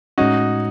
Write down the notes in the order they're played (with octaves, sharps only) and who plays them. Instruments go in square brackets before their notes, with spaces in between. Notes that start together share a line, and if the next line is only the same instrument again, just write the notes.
[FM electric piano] A2 G#3 C#4 [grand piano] D#4 F#4